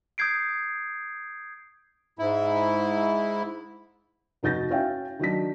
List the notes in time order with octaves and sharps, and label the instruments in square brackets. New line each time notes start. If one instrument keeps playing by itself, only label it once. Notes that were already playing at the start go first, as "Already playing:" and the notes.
[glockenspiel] D#6 G6 G#6 C7 D7
[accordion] G#2 E4
[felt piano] F1 D#4 F#4 G6 A6 A#6
C#4 E4 F#4 E5 F5 G5
D#3 F#3 D4 B6